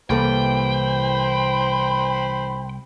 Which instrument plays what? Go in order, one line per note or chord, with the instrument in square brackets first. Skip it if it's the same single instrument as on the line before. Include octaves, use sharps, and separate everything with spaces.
[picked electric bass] C2 [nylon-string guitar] E3 A#3 A4 [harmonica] C5 B5 [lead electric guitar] G5